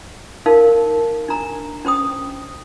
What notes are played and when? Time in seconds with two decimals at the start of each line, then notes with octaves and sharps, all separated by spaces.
0.46 D#4 A#4 F5
1.28 D4 A#5
1.85 C#4 C5 G5 D#6